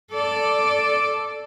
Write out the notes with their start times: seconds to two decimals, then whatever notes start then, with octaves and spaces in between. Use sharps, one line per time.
0.13 A4 D5